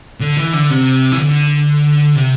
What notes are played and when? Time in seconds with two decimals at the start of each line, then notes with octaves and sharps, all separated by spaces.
0.20 D3
0.37 E3
0.53 D3
0.70 C3
1.12 E3
1.18 D3
2.15 C3